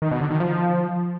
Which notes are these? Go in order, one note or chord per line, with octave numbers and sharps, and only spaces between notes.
D#3
B2
D3
D#3
F3